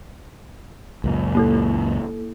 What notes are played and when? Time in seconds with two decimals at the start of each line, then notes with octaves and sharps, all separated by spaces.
1.04 C#2 F#2 A#2
1.35 A#3 E4 A4